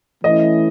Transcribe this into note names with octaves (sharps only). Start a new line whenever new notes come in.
E3 A3 C#4 E4 D#5